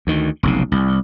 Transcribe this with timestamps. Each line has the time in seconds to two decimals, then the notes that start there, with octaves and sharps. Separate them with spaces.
0.07 D2 D#3
0.43 F1 B1 C#3
0.72 C2